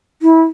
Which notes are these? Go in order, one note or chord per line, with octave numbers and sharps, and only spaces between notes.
E4